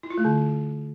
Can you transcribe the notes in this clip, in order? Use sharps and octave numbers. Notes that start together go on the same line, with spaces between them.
E4
F4
A3
D3